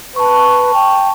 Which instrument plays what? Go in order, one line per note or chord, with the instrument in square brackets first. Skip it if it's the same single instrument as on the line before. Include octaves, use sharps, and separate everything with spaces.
[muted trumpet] B4 [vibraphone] A5 C#6
[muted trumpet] G5